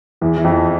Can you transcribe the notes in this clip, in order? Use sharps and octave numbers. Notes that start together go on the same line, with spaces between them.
E2 E3
E3
F2 F3